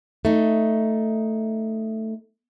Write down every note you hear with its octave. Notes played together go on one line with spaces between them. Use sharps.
A3 D#4